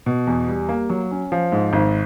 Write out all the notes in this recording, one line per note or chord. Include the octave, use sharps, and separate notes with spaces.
B2
E2
G3
A#3
F#3
C#4
F3
G#2
G#1